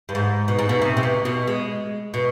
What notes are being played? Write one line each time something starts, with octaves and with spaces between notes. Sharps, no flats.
G2
G#2
B2
G#2
B2
C3
C3
B2
B2
G#3
B2